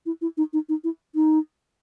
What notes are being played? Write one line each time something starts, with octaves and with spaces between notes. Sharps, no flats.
E4
E4
D#4
D#4
D#4
E4
D#4